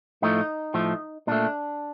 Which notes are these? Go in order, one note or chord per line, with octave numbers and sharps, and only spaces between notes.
A2 F3 A3 D#4
A2 F3 A3
A#2 A3 D4